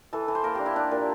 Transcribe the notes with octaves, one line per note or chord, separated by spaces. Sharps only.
E3 A4
E3
C5
A#3 A#4
D4 G4
E4
D4
A#2